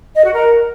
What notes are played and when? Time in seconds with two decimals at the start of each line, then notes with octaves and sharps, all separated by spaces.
0.15 D#5
0.24 F#4
0.33 A#4